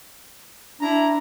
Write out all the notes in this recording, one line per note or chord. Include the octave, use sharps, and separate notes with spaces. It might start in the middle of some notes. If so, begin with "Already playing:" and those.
D4 E4 A#5